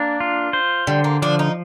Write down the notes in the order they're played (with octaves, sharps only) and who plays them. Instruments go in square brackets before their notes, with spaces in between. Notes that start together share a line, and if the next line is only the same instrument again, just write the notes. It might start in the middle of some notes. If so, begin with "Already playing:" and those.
Already playing: [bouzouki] A#3 [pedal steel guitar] D4
[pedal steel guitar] F4
C5
[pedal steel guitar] D3 [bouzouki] G3
[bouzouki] A#3
[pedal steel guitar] F3 [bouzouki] D4
[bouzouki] D#4